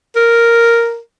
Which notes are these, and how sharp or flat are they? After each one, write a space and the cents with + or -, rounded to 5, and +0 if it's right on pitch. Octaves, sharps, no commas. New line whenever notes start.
A#4 +0